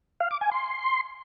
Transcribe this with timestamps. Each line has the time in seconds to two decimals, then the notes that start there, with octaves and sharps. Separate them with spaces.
0.20 F5
0.31 D6
0.41 G#5
0.51 C6